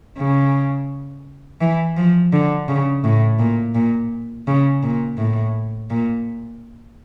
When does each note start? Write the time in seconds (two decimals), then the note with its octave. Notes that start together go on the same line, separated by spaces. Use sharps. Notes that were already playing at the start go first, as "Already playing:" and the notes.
0.18 C#3
1.61 E3
1.97 F3
2.33 D3
2.69 C#3
3.04 A2
3.39 A#2
3.75 A#2
4.47 C#3
4.83 A#2
5.18 A2
5.90 A#2